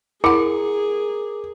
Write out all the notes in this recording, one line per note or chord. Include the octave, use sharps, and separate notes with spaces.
E4 G#4 A#4 F#5 A#5 D6